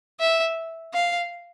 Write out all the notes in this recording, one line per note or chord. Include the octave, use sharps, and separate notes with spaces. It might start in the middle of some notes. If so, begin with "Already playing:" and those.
E5
F5